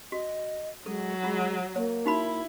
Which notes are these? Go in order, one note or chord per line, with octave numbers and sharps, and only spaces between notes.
F#4 D#5
F#3 G#3 A4
G#3 F4
A#3 C#5
D#4 E4 F#4 B5